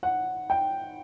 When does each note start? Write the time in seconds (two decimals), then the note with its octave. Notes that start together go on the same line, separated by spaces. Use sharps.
0.03 F#5
0.50 G5